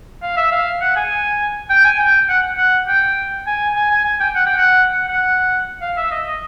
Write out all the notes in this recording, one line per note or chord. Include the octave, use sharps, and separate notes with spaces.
F5
E5
F5
F#5
G#5
G5
G#5
G5
F#5
F#5
G5
G#5
G#5
G#5
G#5
G5
F#5
G5
F#5
F#5
F#5
F5
E5
D#5
D#5